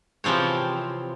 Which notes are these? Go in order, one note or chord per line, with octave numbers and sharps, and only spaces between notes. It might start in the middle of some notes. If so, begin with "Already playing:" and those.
C3 E3 F3 C4 C#5